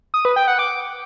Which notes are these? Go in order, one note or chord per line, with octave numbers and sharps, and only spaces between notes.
D#6
B4
G5
F#5
D6